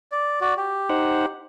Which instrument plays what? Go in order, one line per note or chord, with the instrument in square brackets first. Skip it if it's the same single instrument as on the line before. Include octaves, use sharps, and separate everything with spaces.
[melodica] D5
F#4 D5
G4
[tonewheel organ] D#4 C5 F#5